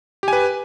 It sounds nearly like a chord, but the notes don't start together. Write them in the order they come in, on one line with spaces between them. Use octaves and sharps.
G4 G#5 B4